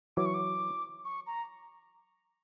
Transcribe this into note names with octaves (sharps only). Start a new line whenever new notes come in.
E3 F#3 D6
C#6
D6
C#6
A#5